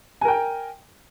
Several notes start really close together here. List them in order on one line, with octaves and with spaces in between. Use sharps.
G#5 A#4 G5